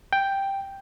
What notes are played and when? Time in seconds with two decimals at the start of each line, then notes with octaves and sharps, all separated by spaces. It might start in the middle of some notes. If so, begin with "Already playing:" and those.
0.13 G5